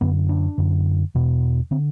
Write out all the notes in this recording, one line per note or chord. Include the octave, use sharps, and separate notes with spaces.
F#2 D3 B3
D4
F#2 D3
E2 B2
D3 C4